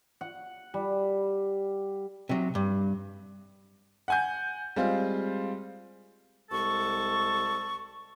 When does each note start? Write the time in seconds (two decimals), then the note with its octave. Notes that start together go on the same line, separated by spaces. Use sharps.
0.21 F#5
0.74 G3
2.29 C3 F#3
2.55 G2
4.08 F#5 G#5 G6
4.76 G3 G#3 C4 F4
6.51 C2 G#3 A4 C#6